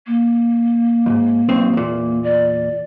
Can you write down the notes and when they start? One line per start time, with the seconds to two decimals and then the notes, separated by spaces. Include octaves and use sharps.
0.07 A#3
1.06 F2 G#2
1.49 B1 B2 C4
1.73 E2 A#2
2.23 D5